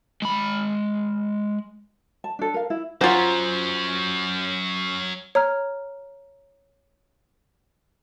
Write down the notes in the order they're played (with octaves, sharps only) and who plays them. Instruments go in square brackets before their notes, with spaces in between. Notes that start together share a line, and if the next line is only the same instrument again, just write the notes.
[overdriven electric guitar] G#3 B5
[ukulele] A5
D4 A4
A#4 F5
E4
[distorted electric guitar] F#3 C#4 [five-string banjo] F4 C5 [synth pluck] F#5 G#5 A#5
[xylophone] C#5 A#5 F6